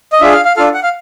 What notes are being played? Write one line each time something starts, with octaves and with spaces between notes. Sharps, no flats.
D#5
D4 F4 G#4 E5
F5
F5
D4 F4 A4 F5
F#5
F5